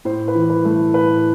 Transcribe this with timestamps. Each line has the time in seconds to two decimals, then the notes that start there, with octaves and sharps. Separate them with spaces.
0.05 A2 C5
0.28 B4
0.35 E3
0.50 B4
0.65 A3
0.94 A2 B4